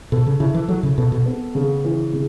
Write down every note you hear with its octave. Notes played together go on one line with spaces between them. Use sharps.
B2 A4
C#3
C#3 E4
E3
F#3 A4
C#3
B2 A4
B2
B3
C#3
E3
C#3